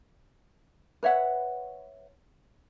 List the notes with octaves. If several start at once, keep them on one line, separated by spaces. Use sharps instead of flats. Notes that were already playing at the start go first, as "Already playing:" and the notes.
B4 C#5 E5 F#5